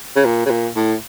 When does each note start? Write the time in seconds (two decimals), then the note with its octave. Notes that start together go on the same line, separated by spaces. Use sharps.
0.16 C#3
0.25 A#2
0.46 C#3
0.50 A#2
0.76 A2